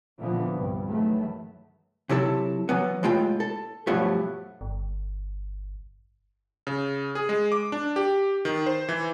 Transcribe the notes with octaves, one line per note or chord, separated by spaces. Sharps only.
A#2 D3 E3 F3 B3
C2 G2
D#3 E3 F#3 A3
C3 F#3 E4 A4
E3 F#3 B3
A2 G#3 F4 G5
A4
G2 B2 F3 F#3 A3
G1
C#3
G#4
G#3
D6
D4
G4
D#3
C5
E3